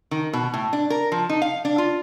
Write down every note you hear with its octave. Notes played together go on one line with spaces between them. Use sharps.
D#3
B2
A2
D4
A#4
F3
D#4
F5
D4
F4